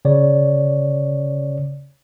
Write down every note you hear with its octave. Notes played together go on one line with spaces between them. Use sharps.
C#3 C#5 D5